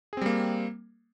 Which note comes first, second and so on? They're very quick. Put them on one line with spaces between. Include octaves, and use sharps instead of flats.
G#4 C4 G3 A#3